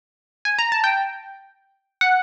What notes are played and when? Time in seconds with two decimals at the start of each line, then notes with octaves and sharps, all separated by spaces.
0.45 G#5
0.59 A#5
0.72 A5
0.84 G5
2.01 F#5